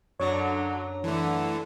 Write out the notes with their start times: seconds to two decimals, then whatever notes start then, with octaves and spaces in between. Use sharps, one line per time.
0.20 F#2 D3 F#3 D4 C#5 A#5
1.04 D3 E3 A3